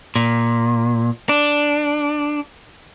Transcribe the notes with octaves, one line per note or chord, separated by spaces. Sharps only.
A#2
D4